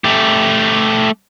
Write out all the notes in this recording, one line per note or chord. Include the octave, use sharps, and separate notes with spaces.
A3 G4